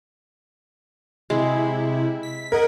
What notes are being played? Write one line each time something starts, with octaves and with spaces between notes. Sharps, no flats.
C3 G#3 E4
B6
A#4 D#5 F#5 G#6